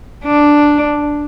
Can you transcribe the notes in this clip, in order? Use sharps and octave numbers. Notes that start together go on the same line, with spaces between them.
D4